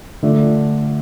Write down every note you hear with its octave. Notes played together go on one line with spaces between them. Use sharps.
D3 A3 D4 F4